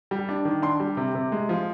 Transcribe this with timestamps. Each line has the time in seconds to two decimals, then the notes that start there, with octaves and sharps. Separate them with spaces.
0.11 G3
0.29 D4
0.45 D#3
0.62 D4 C6
0.80 G3
0.97 C3
1.15 C3
1.32 G#3
1.49 F3